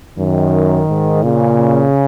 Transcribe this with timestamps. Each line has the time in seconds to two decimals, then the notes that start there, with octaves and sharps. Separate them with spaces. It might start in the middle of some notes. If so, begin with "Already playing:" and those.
0.18 F#2 D#3
0.89 G#2
1.24 A#2 C#3